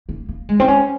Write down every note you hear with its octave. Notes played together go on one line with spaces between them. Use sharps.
A#3
A#3
G#3
C4
C#4